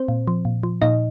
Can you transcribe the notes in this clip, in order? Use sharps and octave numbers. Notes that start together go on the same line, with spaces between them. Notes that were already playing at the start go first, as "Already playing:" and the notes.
Already playing: C4 C5
A#2
F3
A#2
F3
A#2 D#4 D#5